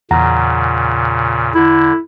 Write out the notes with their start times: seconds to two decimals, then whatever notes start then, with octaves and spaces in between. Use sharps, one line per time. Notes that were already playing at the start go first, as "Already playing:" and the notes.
0.11 E2 A#2 C#3 F#5 A#5
1.55 D3 E4